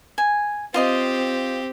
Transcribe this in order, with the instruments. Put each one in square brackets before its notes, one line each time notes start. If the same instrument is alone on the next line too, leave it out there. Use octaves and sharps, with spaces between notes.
[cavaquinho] G#5
[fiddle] C4 G4 [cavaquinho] F4 D#5 C6